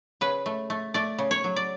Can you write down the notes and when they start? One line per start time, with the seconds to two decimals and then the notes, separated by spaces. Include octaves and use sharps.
0.21 C#3 B4
0.46 A3
0.70 A3
0.94 A3 D5
1.18 C#3
1.31 C#5
1.44 F#3
1.56 D5